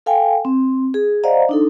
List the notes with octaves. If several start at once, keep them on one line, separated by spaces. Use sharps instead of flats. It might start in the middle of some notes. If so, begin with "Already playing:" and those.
A4 F5 G5 G#5
C4
G#4
C5 D5 D#5 F5 F#5 A#5
D4 D#4 A4